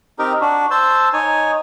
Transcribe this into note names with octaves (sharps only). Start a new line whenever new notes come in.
C4 D#4 G4 A#4
D4 F#4
C5 A5 E6
D#4 C#5 G#5